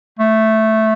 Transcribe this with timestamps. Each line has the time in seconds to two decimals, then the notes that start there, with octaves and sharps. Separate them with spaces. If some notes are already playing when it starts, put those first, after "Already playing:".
0.19 A3